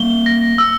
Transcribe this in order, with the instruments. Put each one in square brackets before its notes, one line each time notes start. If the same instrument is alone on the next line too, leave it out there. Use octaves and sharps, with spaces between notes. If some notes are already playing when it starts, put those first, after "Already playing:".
Already playing: [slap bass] G3 A#3 [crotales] G7
[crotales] A#6
E6